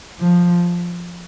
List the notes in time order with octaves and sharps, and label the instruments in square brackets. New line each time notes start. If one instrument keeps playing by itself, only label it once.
[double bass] F3